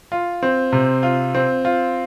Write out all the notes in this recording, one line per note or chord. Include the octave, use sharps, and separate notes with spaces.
F4
C4
C3
F4
C4
F4